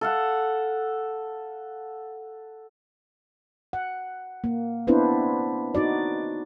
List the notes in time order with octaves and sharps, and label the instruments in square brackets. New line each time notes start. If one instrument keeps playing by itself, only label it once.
[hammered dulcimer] A4 F5 F#5
[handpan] F#5
A#3
B3 C4 D4 E4 B4 C5
D#4 F#4 D5